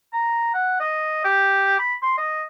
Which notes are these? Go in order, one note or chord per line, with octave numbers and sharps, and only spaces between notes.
A#5
F#5
D#5
G4
B5
C6
D#5